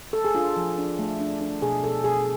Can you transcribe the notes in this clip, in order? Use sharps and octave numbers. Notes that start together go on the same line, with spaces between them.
A4
G#4
D4 F4
F3
D4
A3
D4
D4
B2 G#4
B2 A4
B2 G#4